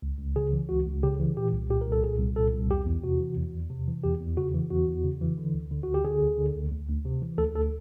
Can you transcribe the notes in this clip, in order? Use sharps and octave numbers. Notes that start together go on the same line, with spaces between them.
C#2
C#2
C#3 G#4
E3
C#2 F#4
C#2
C#3 G4
E3
A#2 G4
C2
A#2 G4
A#4
C2
A4
A#2 G#4
C2
A#2 A4
C2
E2 G4
E2
C3 F#4
E3
E2
E2
C3
E3
E2 G4
E2
C#3 F#4
E3
E2 F#4
E2
C#3
E3
D3
D2
D3
D2 F#4
G4
D3 G#4
D2
D3
D2
D2
D2
C3
E3
D2 A4
D2 A4